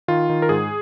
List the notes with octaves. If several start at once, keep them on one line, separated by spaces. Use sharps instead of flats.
D#3 F4
D#3
A#4
G#2 G#4